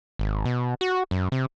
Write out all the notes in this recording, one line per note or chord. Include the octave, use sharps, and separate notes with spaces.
G#1
B2
F#4
F#2
C3